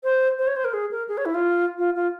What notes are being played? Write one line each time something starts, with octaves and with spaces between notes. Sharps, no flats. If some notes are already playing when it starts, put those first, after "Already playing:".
C5
C5
C#5
C5
A#4
G#4
A#4
G#4
C#5
E4
F4
F4
F4